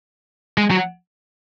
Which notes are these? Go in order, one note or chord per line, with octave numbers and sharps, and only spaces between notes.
G#3
F#3